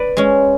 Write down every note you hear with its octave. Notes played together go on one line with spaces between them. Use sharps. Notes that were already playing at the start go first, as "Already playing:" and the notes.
Already playing: B4 D5
G#3 C#4